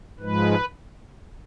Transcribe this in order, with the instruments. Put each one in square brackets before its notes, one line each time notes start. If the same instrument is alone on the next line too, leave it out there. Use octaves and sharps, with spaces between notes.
[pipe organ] G#2 F3 G#3 B4